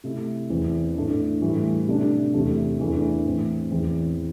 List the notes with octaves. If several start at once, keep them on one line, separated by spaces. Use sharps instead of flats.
C3 A3 E4
E2 E3 C4
A2 A3 D4
A2 E3 G3 E4
C3 A3 D4
E2 C3 E3 A3
E2 E3 A3 D4
A2 E3 C4
E2 E3 C4